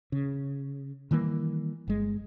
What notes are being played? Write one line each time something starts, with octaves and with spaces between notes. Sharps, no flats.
C#3
D#3 E3 G3 A#3
G1 G#3